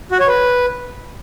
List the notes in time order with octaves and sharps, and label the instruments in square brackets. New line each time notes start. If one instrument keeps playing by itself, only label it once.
[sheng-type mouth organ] F#4
C#5
B4